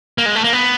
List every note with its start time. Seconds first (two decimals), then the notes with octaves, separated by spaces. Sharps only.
0.18 A#3
0.26 G#3
0.35 A3
0.44 A#3
0.53 B3